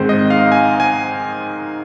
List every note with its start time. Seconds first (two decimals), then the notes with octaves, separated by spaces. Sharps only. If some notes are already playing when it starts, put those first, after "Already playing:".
Already playing: G#2 D#3 G#3 C4 C5
0.09 D#5
0.30 F5
0.52 G#5
0.80 G#5